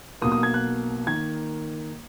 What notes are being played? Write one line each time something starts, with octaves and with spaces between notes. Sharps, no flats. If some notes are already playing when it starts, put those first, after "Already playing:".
B1 B2 A#3 D#6
D#6
G#6
F#6
D#3 A#3 G#6